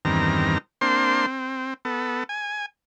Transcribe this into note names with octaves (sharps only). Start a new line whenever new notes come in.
E2 G2 D#3 C4 A#5
A#3 C4 D4 C5 C6
C4
B3 A4
G#5